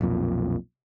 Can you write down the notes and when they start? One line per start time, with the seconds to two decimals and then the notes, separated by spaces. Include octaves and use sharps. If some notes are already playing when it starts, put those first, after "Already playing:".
0.01 B1 F2 A#2